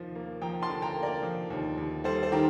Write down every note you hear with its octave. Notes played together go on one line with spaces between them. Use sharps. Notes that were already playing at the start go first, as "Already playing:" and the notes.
Already playing: D#2 F3 A#3
A#3
F3 G5 A#5
A5 C6
D3
G5 A#5
A#3
A#4 D5
F3
D#2
D#2
G3 A4 C5
C5
D#3 G4 A#4